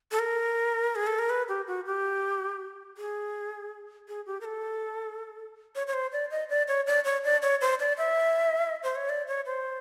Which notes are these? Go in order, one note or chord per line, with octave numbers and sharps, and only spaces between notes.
A4
A#4
G#4
A4
A#4
B4
G4
F#4
G4
G#4
G#4
G4
A#4
A4
C#5
C#5
C5
D5
D#5
D5
C#5
D5
C#5
D5
C#5
C5
D5
E5
C5
C#5
D5
C#5
C5